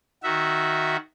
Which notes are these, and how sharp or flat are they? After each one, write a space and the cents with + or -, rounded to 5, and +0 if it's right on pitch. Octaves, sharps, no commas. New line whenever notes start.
D#3 +0 F#4 +0 E5 -10